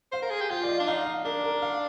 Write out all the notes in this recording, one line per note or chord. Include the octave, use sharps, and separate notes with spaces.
C5 F5
A#4
G#4
G4
F4 F5
D5
D#5
D4
D#4 F5
F5
D4 A#4
A#4
F5